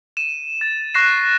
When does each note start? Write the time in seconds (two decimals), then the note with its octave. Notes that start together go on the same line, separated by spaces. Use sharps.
0.17 D#7 E7
0.61 A6
0.94 C#6 F#6 A#6 C7 E7